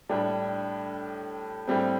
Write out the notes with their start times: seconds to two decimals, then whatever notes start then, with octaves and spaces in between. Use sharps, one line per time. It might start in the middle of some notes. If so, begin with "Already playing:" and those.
0.09 A2 G3 D4
1.68 A2 G3 C4